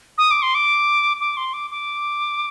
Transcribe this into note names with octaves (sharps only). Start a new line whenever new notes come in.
D#6
D6
C6
D6
D6
C6
D6
D6